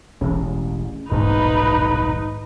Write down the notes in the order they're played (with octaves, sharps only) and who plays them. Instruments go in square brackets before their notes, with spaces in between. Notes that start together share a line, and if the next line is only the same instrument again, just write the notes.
[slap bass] E1 A1 [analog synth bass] C#3
[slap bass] D#1 B1 F2 [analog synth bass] G#2 [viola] D#4 B4